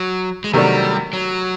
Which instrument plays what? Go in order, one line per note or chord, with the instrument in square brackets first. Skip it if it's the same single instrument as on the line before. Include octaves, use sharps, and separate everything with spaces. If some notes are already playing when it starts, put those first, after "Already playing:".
Already playing: [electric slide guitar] F#3
G#3
[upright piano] C3 D#3 F#3 A3 D4 [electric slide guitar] G3
[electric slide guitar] F#3